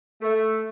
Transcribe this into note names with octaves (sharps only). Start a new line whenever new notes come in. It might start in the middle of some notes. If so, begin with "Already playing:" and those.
A3